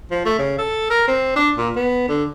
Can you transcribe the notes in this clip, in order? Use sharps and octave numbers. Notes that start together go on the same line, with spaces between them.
F3
A3
C#3
A4
A#4
C4
D4
A#2
B3
D3